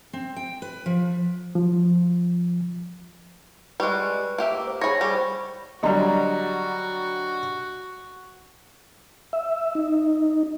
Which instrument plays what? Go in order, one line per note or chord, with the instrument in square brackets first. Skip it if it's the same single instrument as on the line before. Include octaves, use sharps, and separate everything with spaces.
[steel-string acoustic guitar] C4
G5
B4
F3
[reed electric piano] F3
[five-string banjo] G3 G#3 [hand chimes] B4 C#6 F#6
[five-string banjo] A#3 G4 E5
[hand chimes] C5
[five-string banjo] G#4 C#5 [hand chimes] B5 C#6 A#6
[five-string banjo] G3 [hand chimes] C5
[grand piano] D3 F#3 G3 [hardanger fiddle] F#4 [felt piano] D5 D#5 A#5
[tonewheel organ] E5
D#4